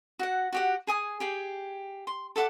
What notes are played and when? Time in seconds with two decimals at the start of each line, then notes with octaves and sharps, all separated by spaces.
0.19 F#4 F#5
0.53 F#4 G4 F#5
0.87 G#4 G#5 D#6
1.20 G4 G#4 G5
2.07 C6
2.36 A4 E5 F#5 D6